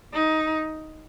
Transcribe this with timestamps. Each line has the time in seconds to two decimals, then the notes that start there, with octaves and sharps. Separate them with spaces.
0.13 D#4